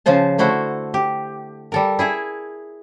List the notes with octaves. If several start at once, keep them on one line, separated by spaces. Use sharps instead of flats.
C#3 F3 F4 C5 A5
D3 A3 E4 F#4 C5
G4
G3 A4 A#4
E4 G#4 E5